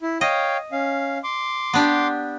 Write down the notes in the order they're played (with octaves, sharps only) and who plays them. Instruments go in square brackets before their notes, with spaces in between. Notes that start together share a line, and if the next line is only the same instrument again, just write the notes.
[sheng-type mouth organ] E4
[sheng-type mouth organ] C#5 F5 G5 [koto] D#5
[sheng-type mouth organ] C#4 F5
C6 D6
[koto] B3 D4 G4